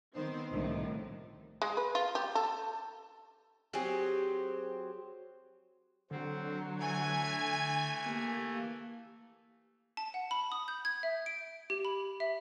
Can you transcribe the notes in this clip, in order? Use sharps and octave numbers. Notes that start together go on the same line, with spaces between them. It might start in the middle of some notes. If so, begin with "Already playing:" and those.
D#3 B3 C4 C5
C2 F2 A2 D3 D#3
G#3
B4
F4
G4
A4
F#3 C4 G4 G#4
D3 F#3 C4
E3 A3 G#5 G#6
A#3 G4
A5
F#5
B5
D#6
G6
G#6
E5
D7
G4
B5
E5